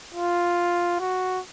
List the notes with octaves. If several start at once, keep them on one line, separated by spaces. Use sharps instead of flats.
F4
F#4